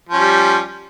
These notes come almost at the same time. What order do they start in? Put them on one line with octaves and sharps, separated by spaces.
F3 C#4 G3